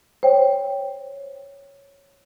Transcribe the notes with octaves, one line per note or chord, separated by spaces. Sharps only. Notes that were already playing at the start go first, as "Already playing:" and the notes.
C5 C#5 G5